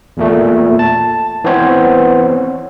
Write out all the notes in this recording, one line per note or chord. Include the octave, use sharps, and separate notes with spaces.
E2 A#2 A3
A5
E3 B3 C4 C5 C#5